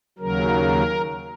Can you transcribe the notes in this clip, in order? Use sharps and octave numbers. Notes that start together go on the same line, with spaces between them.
D#2 C#3 F#3 A#4